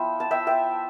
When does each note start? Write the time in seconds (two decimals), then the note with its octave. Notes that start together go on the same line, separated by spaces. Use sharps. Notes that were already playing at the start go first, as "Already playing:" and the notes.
Already playing: F3 B3 E4 E5 G5
0.20 A5
0.31 E5 G5
0.47 E5 G5